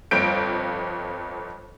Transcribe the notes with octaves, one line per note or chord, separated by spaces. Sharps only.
G1 F2 G6 D7